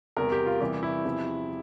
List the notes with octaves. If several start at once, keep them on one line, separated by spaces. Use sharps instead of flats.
E2 C3 G3 A#4
G4
F4
E2 C3 E3 G3 G4
E4
E2 C3 F3